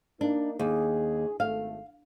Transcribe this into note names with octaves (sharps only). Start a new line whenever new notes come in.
A#3 D4 D#4
D#2 G#4
G#1 A3 F5